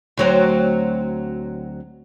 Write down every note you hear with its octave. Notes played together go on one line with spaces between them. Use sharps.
D2 F#3 C4